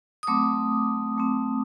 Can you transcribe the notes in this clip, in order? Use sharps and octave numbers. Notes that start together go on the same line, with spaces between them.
D#6
F#3 A3 C4 D6
F#3 A3 C4